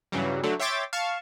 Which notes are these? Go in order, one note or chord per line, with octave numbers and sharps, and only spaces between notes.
G2 C#3 E3 F#3 G3
D3 F#3 A3 A4
C#5 E5 G5 C6 D6 A6
F5 A5 C#6